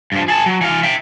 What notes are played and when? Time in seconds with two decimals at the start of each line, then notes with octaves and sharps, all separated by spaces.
0.12 G2 F3
0.28 G#4 A5
0.46 F#3
0.61 E3 F5
0.83 E5 G5